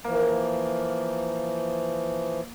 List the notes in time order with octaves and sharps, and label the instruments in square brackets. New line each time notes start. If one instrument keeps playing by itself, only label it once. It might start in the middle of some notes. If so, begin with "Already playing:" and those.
[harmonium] E3 F3 [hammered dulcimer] A#3